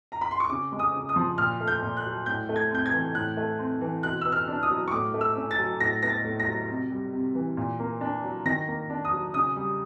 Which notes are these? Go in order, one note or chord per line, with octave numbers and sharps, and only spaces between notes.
A#5
B5
C6
C#6
C#3 D6
G#3
D#6
C#3
D#6
F3
A#2 F6
A3
G6
A#2
F#6
F#3
A2 G6
A3
G#6
C4 G6
G#6
E3
A2 F#6
A3
C4
E3
B2 F#6
B3 E6
F6
D4
D#6
F#3
C#6
A2 D6
A3
E6
C#4
A6
F#3
A2 A#6
B3 A#6
A6
A2
A#6
F#3
C3
G3
C3
E3
A#2
A#3
D4
F#3
D#3 A#6
A#3
D4
D#6
F#3
C#3 D#6
G3